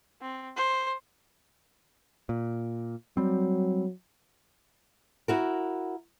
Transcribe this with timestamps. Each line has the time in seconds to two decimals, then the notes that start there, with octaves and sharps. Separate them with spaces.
0.21 C4
0.57 C5
2.29 A#2
3.17 F#3 G3 C4
5.28 E4 F#4 A#4